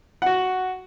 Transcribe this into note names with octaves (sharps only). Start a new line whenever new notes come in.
F#4 F#5